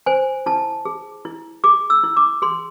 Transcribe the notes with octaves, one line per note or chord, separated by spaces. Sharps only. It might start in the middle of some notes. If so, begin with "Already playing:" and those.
C5 G#5
E4 A5
G#4
E4
G#4 D6
E6
E4
D6
G#4 C6